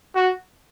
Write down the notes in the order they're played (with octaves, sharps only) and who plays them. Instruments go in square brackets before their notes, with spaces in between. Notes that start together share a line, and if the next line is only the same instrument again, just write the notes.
[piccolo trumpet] F#4